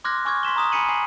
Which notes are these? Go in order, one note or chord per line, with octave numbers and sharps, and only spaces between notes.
C6 D6 F6 F#6 G#6 A#6
G#5 C#6 D6 F6 G#6
C6 B6 E7 G7
A#5 D#6 E7
G#5 B5 B6 C#7 D#7 F#7
G#5 C7 F#7